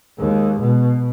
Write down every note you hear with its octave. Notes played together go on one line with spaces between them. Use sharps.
D#2 G#3
B2